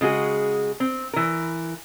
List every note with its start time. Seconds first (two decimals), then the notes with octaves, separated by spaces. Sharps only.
0.01 C#3 G#3 F#4 G#4
0.80 C4
1.13 E3 A#4